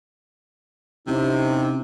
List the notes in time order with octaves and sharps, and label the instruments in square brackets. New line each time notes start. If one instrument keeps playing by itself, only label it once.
[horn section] C3 [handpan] C4 C#4 E4 [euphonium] D#4